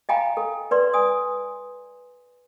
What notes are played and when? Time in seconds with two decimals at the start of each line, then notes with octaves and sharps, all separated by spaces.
0.09 D#5 F5 G5 G#5 A#5 B5
0.37 A4
0.71 B4 D5 C6
0.94 G#5 D#6